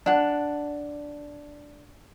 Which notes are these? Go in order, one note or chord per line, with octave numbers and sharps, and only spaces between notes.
D4 F#5